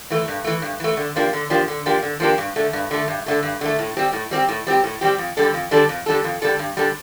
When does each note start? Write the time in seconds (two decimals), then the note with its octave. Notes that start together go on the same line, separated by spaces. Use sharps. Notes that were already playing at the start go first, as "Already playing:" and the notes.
0.10 E3 A3
0.28 G2
0.44 E3 A3
0.62 G2
0.80 E3 A3
0.97 D3
1.16 F3 A#3 D4 G4
1.33 D3
1.50 F3 A#3 D4 G4
1.68 D3
1.86 F3 A#3 D4 G4
2.03 D3
2.20 F3 A#3 D4 G4
2.38 G2
2.56 D3 A3
2.73 G2
2.91 D3 A3
3.08 G2
3.26 D3 A3
3.43 G2
3.61 D3 A3
3.79 A2
3.97 G3 C4 G4
4.13 A2
4.31 G3 C4 G4
4.49 A2
4.67 G3 C4 G4
4.84 A2
5.01 G3 C4 G4
5.18 F2
5.37 D3 G3 D4 A4
5.54 F2
5.71 D3 G3 D4 A4
5.89 F2
6.06 D3 G3 D4 A4
6.24 F2
6.42 D3 G3 D4 A4
6.59 G2
6.77 D3 G3 D4 A4